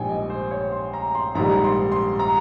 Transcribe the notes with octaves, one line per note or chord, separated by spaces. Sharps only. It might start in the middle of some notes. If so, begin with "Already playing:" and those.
Already playing: A#1 G#2 G3 G5 G#5
D#5
C5
C#5
C6
A#5
C6
A#1 G#2 D#3 G3 A#5
C6
C6
A#5